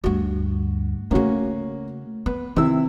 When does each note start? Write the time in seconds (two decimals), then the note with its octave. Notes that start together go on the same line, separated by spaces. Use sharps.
0.04 D2 G2 F#4
1.11 C#3 A3 A#3 C#4 F#4
2.26 B3 B4
2.56 C3 D#3 E4 E6